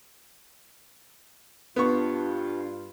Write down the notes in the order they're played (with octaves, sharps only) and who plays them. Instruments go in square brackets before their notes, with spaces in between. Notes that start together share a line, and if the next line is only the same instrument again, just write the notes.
[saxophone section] G2 F4 [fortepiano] B3 C#6 [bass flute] D4